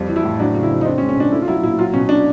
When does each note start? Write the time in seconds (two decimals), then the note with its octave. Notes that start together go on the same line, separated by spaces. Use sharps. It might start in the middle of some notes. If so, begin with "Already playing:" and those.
Already playing: F2 G3
0.09 E3
0.16 E4
0.24 A2
0.40 F#3 D4
0.55 C#3
0.63 E4
0.70 F2
0.81 D#4
0.86 C4 D4
0.98 C#4
1.01 G#3
1.09 C#4
1.17 B2 D4
1.32 A3 E4
1.42 F4
1.48 F#3 E4
1.63 A#2 E4
1.78 F#3 F4
1.94 B2 C#4
2.09 D4